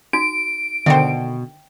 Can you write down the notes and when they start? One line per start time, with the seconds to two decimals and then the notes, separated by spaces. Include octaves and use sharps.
0.13 D#4 F#4 D7
0.86 B2 D3 D#3 C5 E5 G5